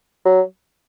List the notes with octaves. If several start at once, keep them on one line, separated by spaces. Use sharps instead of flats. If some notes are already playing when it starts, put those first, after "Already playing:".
F#3